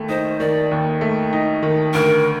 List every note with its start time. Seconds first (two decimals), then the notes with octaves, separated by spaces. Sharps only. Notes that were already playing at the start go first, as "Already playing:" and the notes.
Already playing: D#2 A3
0.09 D#4 C5
0.39 D#3 D5
0.71 D#2
1.01 A3
1.33 D#4
1.63 D#3
1.94 D2 A#4